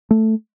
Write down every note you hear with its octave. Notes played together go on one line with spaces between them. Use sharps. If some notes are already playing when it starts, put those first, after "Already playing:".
A3